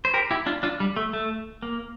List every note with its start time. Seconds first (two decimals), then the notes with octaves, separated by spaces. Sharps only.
0.05 C5
0.14 G4 A#4
0.31 E4 G4
0.46 D4 F4
0.63 D4 F4
0.80 G3
0.96 A3
1.13 A3
1.62 A#3